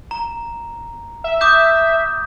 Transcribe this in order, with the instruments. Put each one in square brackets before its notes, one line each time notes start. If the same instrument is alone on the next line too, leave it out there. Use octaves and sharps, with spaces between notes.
[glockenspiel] A#5
[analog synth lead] E5
[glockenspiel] D6 D#6 G6